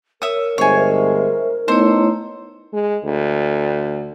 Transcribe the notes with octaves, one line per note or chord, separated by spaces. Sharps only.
A#4 C#5 E5 D#6
G1 D2 G#3 C5 C#5 E5 G#5
A3 B3 D#4 E4 C5 C#5
G#3
D2